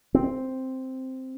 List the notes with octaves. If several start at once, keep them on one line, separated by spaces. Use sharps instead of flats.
C4